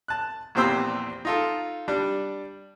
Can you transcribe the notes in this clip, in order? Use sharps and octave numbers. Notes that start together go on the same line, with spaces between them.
A5 F#6
A#1 E2 C4 G4 C5 E6
D#4 F4 A4
G3 D4